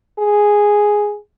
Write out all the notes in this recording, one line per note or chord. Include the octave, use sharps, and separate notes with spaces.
G#4